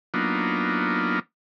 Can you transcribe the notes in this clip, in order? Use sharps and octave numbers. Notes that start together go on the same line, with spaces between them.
F#3 A#3 B3 D4 D#4 F4